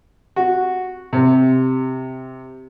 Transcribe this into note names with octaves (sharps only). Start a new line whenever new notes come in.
F#4
C3